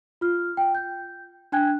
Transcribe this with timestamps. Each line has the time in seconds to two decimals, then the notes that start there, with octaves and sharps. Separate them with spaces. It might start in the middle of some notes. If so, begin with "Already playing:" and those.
0.21 F4 F6
0.57 G5
0.75 G6
1.52 D4 G5 G#5 F#6 G#6